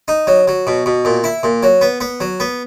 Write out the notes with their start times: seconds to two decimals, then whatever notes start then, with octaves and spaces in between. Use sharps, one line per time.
0.08 D#4
0.27 F#3
0.48 F#3
0.67 B2
0.86 B2
1.05 A#2
1.24 E4
1.43 A#2
1.63 F#3
1.81 B3
2.01 B3
2.20 F#3
2.40 B3